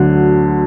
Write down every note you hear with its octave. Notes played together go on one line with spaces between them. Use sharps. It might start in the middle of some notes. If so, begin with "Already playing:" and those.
Already playing: D2 D3 F#3